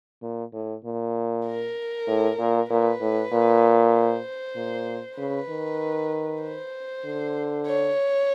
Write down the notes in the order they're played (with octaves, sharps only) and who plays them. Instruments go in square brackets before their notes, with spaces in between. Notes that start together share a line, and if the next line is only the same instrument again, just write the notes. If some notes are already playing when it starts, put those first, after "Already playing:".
[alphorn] A#2
A2
A#2
[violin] A#4
[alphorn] A2
A#2
[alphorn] A#2 [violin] B4
[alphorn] A2
A#2
[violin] C5
[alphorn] A#2
[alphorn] C#3 [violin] B4
[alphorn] D#3
[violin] C5
[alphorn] D3
[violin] C#5